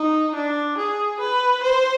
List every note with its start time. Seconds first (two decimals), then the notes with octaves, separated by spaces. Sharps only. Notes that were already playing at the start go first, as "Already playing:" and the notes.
Already playing: D#4
0.35 D4
0.78 G#4
1.20 B4
1.63 C5